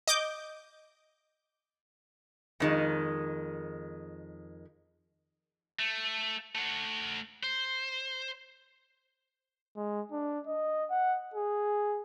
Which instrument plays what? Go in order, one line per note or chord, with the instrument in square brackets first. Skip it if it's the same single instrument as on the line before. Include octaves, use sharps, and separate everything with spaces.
[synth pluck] D#5 D6 G6
[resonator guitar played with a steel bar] F2 D#3 G#3
[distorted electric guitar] A3
A3 F#5
C5
[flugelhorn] G#3
D4
D#5
F#5
G#4